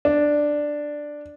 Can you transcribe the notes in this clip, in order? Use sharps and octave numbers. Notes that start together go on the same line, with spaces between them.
D4